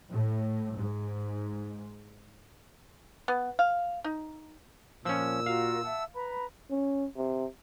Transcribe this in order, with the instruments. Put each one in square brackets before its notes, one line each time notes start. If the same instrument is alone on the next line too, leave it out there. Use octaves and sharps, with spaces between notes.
[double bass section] A2
G#2
[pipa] B3
F5
D#4
[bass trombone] A#2 [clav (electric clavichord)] F3 C#4 [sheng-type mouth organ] E6
[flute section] F4 F#4 A#4 [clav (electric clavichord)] F5
[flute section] E5 F#5 A5
B4 A#5 B5
[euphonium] C#4
C3